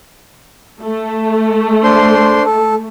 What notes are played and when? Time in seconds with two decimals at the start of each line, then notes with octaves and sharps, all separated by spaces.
0.81 A3
1.83 D4 C5 C6
2.46 A4